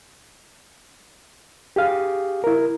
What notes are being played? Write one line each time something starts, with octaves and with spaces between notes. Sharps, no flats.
G4 G#4 F5
E4 A#4